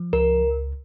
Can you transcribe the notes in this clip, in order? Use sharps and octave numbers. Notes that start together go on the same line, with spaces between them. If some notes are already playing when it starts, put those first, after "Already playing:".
Already playing: F3
C#2 A#4